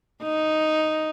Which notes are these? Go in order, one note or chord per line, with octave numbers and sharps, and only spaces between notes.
D#4